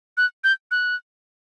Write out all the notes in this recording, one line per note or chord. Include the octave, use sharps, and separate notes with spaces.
F#6
G6
F#6